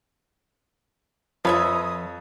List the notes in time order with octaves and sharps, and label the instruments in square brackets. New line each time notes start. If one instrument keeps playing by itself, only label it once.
[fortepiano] F2 [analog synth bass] F3 [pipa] B4 C#5 E5 [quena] D#6